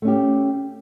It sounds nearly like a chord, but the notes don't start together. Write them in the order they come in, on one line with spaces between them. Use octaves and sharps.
A3 C#4 G4